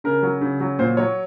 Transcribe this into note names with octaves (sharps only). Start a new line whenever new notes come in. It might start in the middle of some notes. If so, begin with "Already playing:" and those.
C#3 A#4
F#3
C#3
F#3
A#2 C5
F#3 C#5